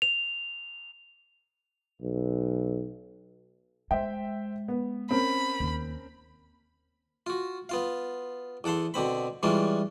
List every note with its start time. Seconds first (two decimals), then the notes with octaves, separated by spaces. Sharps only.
0.02 F7
2.01 B1
3.91 G#3 C5 E5 G5
4.68 B3
5.11 C4 C#4 A#4 B5
5.60 D#2
7.26 F4 F#4
7.69 B3 F4 F5
8.64 E2 A4 F#5 A5 C6
8.94 B2 D3 C4 B5
9.43 E3 G3 G#3 C#4 D4 F4